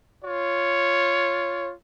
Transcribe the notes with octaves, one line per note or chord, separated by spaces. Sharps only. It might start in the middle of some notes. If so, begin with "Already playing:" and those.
F4 C#5